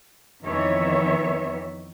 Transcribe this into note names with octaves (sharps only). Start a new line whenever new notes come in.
F2 D#3 E3 B3 C#5 E5